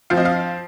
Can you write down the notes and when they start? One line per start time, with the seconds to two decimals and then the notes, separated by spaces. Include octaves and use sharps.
0.10 F3 C4 F5
0.18 D#5
0.25 F5